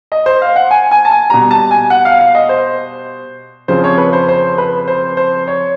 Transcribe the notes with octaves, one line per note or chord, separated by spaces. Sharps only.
D#5
C5
F5
F#5
G#5
G#5
A5
G#5
B2 G3 A#5
A5
G#5
F#5
F5
F5
D#5
C5
F2 C#3 F3 C5
C#5
B4
C5
C5
B4
C5
C5
C#5